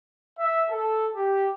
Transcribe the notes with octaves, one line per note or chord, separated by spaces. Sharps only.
E5
A4
G4